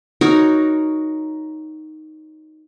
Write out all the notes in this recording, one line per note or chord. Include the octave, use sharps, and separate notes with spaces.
D#4 F#4 A#4 C#5